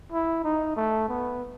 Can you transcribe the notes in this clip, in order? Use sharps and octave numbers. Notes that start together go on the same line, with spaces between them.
E4
D#4
A3
B3